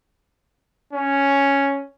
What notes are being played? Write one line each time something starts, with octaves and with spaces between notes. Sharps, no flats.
C#4